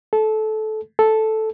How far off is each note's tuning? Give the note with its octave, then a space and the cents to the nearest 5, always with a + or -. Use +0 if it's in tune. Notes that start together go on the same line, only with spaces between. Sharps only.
A4 -20
A4 -5